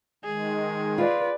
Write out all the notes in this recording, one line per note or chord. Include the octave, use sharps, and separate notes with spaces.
D#3 G#3 G#4
F4 B4 D5